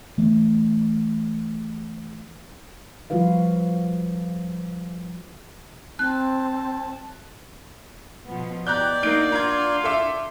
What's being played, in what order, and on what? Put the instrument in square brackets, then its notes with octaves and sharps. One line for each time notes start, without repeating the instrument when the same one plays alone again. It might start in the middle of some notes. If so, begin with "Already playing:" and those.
[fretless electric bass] E3 A3 B3
[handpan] F3 G3 F4 F#4 B4 F5
[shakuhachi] C4 [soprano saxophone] A5 [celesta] F#6
[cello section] B2 F3 B3
[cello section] B2 G4 [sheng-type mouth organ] D5 [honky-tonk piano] A#5 F#6 G6
[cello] A#3 D#4 [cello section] D4 F#4 [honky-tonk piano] G6 D7
[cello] F4 [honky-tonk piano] A#5 G#6
[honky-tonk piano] A4 E5 D6